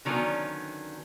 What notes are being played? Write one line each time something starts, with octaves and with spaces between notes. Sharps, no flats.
D3 D#3 F#3 B3 C#4